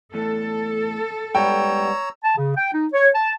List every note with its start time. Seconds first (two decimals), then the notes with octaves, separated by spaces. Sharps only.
0.14 E2 A2 A4
1.35 G#2 G3 B3 C#5 G5 A#5 E6
2.24 A5
2.37 C#3
2.57 G5
2.73 D#4
2.93 C#5
3.15 A5